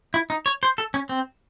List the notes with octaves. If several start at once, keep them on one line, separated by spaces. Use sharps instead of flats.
E4
D#4
C#5
C5
A4
C#4
C4